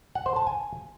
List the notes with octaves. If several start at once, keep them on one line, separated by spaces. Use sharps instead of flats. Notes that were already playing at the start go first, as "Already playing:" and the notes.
F#5
C5
A5
G#5